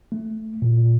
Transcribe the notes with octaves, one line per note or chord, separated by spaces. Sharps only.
A3
A#2